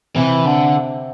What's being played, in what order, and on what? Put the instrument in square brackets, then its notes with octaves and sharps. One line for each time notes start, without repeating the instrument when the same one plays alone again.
[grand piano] C3 [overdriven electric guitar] E3
[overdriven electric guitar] D3